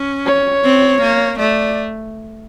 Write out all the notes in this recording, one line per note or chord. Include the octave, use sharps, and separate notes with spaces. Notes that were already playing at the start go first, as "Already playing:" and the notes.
Already playing: C#4
C#5
C4
A#3
A3 D5